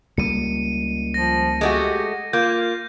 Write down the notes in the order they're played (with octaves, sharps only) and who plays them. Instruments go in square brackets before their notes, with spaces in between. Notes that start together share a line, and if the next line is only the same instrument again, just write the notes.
[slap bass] C#2 G3 A#3 [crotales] C#7 D#7
[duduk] F3 [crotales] A#6
[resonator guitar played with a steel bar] G#3 A3 F#4 [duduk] G4
[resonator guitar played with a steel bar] A#3 [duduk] F4 [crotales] G6